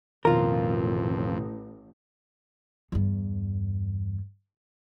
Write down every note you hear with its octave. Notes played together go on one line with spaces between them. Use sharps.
A1 F2 B2 D#3 F4 A#4
E2 G2